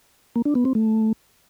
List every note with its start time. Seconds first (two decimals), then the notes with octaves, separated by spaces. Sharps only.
0.36 A#3
0.45 D4
0.55 B3
0.65 C4
0.75 A3